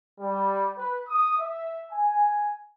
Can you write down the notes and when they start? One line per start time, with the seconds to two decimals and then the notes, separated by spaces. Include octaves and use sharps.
0.20 G3
0.76 B4
1.06 D#6
1.38 E5
1.91 G#5